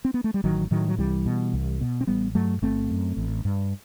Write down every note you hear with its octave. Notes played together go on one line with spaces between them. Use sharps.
C4
B3
A3
G3
A1 D#3 F#3
A2 D#3 F#3
F#3
C2 E3 G3
B2
C2
B2
C4
A1 G3 B3
G2 F#3 A3
G1 A3 C4
F#2
A1
G2